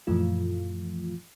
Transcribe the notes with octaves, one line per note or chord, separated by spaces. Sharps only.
F#2 A#2 E3 F3 A3 F4